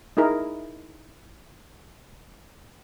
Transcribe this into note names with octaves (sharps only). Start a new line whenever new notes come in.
D#4 E4 G#4 A#4